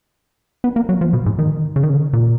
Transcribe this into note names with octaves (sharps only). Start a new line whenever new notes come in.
B3
A#3
F#3
F3
B2
G#2
D#3
C#3
D#3
C#3
A#2